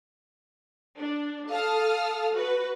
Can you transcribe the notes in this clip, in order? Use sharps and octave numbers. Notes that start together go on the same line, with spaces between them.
D4
A4 F5 A5 D#6 F6
F#4 B4